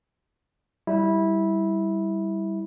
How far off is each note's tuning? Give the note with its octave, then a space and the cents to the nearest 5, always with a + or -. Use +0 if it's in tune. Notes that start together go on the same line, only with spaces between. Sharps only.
G3 +0 E4 -15